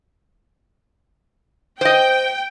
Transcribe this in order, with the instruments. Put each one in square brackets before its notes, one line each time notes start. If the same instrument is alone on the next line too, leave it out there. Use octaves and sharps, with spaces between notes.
[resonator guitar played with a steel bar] C5 D#5 [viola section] G5